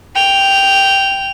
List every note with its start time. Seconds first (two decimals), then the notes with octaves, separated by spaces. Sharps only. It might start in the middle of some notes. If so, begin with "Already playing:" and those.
0.15 G5 F7